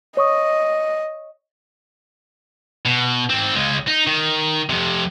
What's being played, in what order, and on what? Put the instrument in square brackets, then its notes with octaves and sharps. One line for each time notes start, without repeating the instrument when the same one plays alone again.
[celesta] C#5 C#6 D#6 [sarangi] D#5
[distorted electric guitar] B2
G#2 C4
C#2 G#3
D#4
D#3
F2 C3